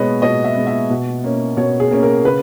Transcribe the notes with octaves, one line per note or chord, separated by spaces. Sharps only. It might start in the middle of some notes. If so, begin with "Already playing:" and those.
Already playing: B2 G#3 B3 C#5 D#5
B2 D#5
E5
G#3 B3
E5
B2
A#3 C#4
B2 C#5
G#4
A#3 C#4
A#4
C#3 B4